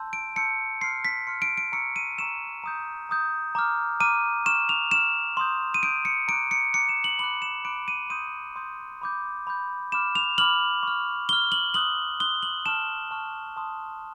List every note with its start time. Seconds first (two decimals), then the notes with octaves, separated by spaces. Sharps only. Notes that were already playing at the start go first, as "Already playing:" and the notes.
Already playing: A5 C6 E6 G6
0.13 D7
0.36 A5 C6 E6 G6 C#7
0.81 C6 F6 C7
1.05 B6
1.27 C6 F6 C#7
1.42 D7
1.57 D7
1.72 A#5 C#6 E6 C#7
1.96 D#7
2.18 A#5 C#6 E6 E7
2.64 A#5 D#6 G6
3.09 A#5 D#6 G6
3.55 A#5 D6 F6
4.00 A#5 D6 F6 D#7
4.46 C#6 F6 E7
4.69 F7
4.91 C#6 F6 E7
5.37 C6 D#6 G6
5.74 D#7
5.83 C6 D#6 G6 D7
6.05 C#7
6.28 A#5 D6 F#6 D7
6.51 C#7
6.73 A#5 D6 F#6 C#7
6.89 E7
7.04 F#7
7.19 B5 D6 F#6 F#7
7.42 E7
7.65 B5 D6 F#6 D7
7.88 D#7
8.10 C6 D#6 G6 D#7
8.56 C6 D#6 G6
9.02 B5 D6 G6
9.47 B5 D6 G6
9.92 B5 D6 F6 E7
10.15 F7
10.38 B5 D6 F6 F#7
10.83 C#6 F6
11.29 C#6 F6 G7
11.52 F#7
11.74 C6 D#6 F#6 F#7
12.20 C6 D#6 F#6 G7
12.43 F#7
12.66 A5 C#6 F6 E7
13.11 A5 C#6 F6
13.57 A5 C6 D#6